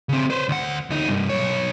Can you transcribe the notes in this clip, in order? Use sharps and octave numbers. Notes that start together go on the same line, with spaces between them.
C#3 C4
B4 C5
D2 F#5
D2 D#4
C2 G2
B1 C#5